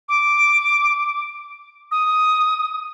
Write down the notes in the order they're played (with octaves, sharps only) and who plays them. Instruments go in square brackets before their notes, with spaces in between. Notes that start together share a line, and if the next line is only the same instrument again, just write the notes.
[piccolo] D6
D#6